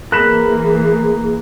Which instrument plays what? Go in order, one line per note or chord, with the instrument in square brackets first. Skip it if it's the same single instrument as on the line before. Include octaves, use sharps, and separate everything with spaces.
[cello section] E3 A#3 [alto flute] G#4 [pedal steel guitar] A#4 B5 [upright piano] F#6 E7